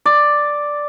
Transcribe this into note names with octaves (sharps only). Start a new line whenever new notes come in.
D5